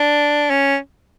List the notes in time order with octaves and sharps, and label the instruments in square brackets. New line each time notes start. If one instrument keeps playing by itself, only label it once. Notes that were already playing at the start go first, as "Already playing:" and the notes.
Already playing: [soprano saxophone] D4
C#4